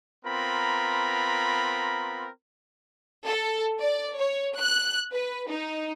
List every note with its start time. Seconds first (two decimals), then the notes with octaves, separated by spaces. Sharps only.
0.25 B3 C4 F4 A#4 A#5 B5
3.26 A4
3.82 D5
4.19 C#5
4.60 F#6
5.13 B4
5.50 D#4